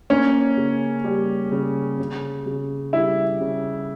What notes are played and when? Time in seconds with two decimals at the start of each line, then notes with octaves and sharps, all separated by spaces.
0.10 A#3 C#4
0.57 C#3
1.04 G3
1.52 C#3
1.99 C#3
2.46 C#3
2.93 G3 E4
3.41 C#3